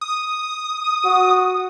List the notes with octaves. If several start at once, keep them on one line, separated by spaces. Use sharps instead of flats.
D#6
F#4